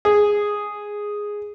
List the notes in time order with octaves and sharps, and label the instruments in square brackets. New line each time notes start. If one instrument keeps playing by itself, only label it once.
[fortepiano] G#4